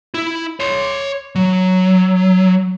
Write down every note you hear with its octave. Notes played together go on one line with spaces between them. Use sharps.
E4
C#5 C6
F#3